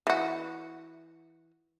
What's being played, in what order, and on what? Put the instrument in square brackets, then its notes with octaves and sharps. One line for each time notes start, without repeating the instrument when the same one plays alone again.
[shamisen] E3 F#4